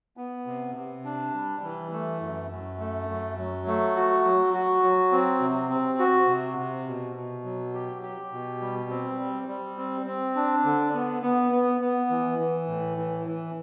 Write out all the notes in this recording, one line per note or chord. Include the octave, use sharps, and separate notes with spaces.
B3
C3
C3
D4
G3
E3
A3
F#2
F#2
A3
F#2
F#3
A3
F#4
F#3
F#4
F#3
C4
C3
C4
F#4
C3
C3
B2
B2
F#3
G4
G4
B2
G3
C4
G3
G3
C4
C4
D4
D3
B3
B3
B3
B3
E3
E3
A2
E3
E3